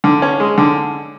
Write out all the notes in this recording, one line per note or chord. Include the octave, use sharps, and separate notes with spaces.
D3
C#4
G#3
D3